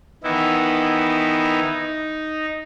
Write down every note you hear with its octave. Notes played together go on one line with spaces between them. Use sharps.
D#3 E3 B3 D#4 E4
D#4